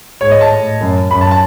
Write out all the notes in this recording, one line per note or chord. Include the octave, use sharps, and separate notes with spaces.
G#2 C#5
D#5
A5
A2
F#2
F#2 B5
A5
A5